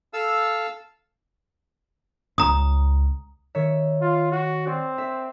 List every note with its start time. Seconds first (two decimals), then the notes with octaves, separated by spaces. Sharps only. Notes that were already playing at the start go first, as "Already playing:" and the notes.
0.13 A4 F5 E6
2.38 C#2 A#5 D#6
3.55 D#3 C#5 E5
4.01 F4
4.32 F#4
4.66 C4 D5
4.98 E5